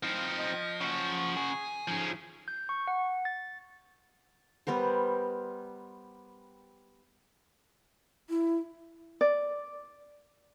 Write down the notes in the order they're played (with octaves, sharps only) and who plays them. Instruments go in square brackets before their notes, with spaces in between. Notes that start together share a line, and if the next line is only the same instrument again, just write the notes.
[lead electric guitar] F3 [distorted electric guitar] C4 D#4 [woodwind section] E4 F5 F6
[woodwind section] D#5
[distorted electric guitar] C#3 F#4 [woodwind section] C#6
[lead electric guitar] G#4
[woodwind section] D3 F#3 D#4 [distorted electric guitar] F3 C#4
[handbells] G6
C#6
F#5
A6
[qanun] G3 B3 A#4 C5
[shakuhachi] E4
[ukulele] D5